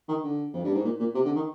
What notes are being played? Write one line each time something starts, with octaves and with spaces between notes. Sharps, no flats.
D#3
D3
F2
G2
G#2
A#2
A#2
C3
D3
D#3